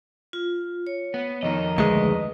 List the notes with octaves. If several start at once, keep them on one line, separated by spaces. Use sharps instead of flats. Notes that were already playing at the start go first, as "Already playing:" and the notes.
F4
C#5
B3
F2 D#3 D#4 D#5
D2 G#3 B4